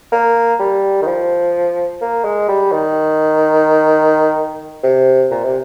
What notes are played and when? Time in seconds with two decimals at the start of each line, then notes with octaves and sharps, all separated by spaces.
0.12 A#3
0.59 G3
1.02 D#3
1.07 F3
2.01 A#3
2.24 G#3
2.48 G3
2.72 D#3
4.83 C3
5.31 A#2
5.44 C3